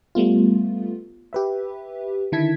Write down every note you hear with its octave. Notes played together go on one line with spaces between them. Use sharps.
G3 A3 B3 F4
G4 B4 E5
D3 D#3 E4 A5 G#6 B6